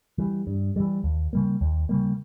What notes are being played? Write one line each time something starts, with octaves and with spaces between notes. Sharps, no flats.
E3 G3
G2
E3 G3
D#2
C#3 G3 A#3
D#2
C#3 G3 A#3